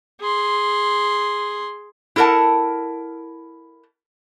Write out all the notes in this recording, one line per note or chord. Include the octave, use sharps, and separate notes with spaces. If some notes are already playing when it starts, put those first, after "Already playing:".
G#4 C6
E4 A4 A#4 F#5 A5